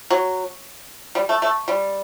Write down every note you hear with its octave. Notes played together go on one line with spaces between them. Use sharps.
F#3
G3
A3
A3
G3